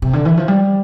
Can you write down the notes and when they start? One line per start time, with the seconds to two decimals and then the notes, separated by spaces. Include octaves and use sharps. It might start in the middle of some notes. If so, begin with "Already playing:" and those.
0.02 C3
0.13 D3
0.25 E3
0.37 F3
0.48 G3